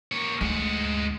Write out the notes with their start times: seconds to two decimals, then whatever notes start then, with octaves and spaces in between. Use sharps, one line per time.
0.12 A#3 C#5
0.41 D2 G#3 F#5